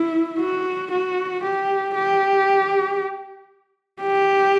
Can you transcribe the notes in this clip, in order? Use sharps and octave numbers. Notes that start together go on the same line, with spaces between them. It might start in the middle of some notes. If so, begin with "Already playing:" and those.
Already playing: E4
F#4
F#4
G4
G4
G4